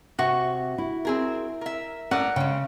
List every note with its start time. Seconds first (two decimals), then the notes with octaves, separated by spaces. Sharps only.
0.19 C3 F#4 C#6
0.78 E4
1.05 C4 G#4 A#4
1.61 A#4 E5
2.11 A2 C#4 A#4 D5 F#5
2.36 C#3 G#3 G5